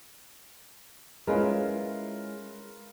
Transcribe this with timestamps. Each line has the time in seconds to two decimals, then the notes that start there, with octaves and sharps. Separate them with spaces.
1.27 G#3 C#4 E4 F4 A#4 B4